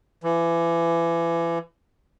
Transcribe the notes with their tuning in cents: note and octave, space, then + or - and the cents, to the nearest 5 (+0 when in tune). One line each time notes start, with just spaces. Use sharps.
E3 +30